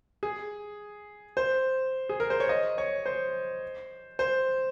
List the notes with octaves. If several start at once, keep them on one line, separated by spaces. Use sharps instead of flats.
G#4
C5
G#4
A#4
C5
C#5
D#5
C#5
C5
C5